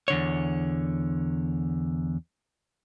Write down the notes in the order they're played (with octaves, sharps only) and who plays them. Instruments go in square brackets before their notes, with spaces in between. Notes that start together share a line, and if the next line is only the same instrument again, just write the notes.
[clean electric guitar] E2 D3 C#5